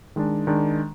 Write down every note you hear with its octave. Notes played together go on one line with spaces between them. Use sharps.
D#3 G#3 D4
D#3 G#3 D4